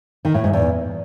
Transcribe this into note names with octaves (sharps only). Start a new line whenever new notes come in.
D#3
A2
G#2
E2